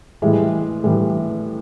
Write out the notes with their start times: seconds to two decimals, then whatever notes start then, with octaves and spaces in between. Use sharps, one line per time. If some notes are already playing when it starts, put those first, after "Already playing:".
0.22 A2 E3 G3 G#3
0.84 A2 E3 G3